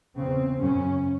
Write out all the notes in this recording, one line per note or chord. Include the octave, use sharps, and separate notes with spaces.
E2 C#3 C4
F#2 C#3 C#4